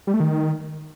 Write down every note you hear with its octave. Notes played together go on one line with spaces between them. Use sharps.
G3
A3
D#3